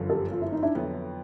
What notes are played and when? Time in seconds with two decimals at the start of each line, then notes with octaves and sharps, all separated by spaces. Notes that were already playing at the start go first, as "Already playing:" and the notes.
Already playing: G1 F#2 D3 F3
0.10 G4 A4
0.32 F4
0.42 E4
0.52 D#4
0.62 D4 E4
0.75 F2 D3 F#3 B3